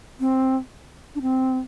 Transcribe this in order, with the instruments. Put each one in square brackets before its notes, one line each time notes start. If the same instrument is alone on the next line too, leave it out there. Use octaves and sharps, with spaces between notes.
[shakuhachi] C4
D4
C4